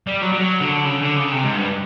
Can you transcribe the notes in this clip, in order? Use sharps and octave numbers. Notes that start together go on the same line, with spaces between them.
G3
F#3
G3
F#3
D3
C#3
D3
C#3
C3
G#2
G2